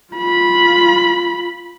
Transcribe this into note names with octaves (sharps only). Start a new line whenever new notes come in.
F4 B5